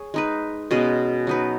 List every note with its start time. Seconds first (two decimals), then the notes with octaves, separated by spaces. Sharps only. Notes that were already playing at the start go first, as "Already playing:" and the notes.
Already playing: G#4 C#5
0.14 G#3 D#4 B4
0.71 B2 G#3 C#4 G#4
1.27 F#3 D#4 B4